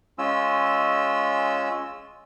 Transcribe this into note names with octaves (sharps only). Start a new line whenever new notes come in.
G#3 C#4 F4 E6